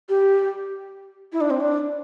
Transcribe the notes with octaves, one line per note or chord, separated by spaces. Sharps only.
G4
E4
D4
C4
D4